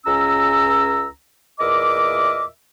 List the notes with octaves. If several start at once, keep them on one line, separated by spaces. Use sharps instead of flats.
C#2 C#4 A#5 E6
E2 A#2 A#4 D#5 E5 D6